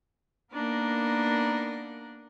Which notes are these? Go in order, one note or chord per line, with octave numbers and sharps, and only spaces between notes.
A#3 B3 D4 D#4 A#4